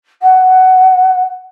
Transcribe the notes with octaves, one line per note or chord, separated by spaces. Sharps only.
F#5